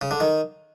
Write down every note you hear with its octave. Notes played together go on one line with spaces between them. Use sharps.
C#3
D3
D#3